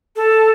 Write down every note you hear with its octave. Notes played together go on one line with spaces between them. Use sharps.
A4